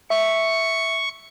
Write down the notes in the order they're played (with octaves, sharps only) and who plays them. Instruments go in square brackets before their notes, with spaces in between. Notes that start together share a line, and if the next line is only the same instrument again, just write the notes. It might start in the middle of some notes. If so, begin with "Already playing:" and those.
[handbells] E5 [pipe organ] C#6